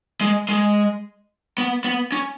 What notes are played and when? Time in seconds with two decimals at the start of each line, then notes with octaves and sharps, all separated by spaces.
0.21 G#3
0.49 G#3
1.58 B3
1.84 B3
2.12 C#4